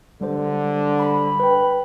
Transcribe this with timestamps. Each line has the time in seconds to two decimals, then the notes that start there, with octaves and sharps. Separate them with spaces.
0.21 D3 G3 C5
0.98 B5
1.40 B4 G5